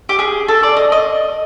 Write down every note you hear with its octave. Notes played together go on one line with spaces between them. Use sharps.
G4
G#4
A4
D5
D#5
D#5